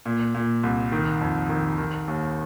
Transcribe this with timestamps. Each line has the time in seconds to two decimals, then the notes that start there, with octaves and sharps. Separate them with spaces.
0.06 A#2
0.35 A#2
0.63 C2
0.92 D#3
1.21 F2
1.49 D#3
1.78 D#3
2.08 D#2